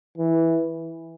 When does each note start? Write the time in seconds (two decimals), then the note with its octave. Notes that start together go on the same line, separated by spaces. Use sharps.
0.18 E3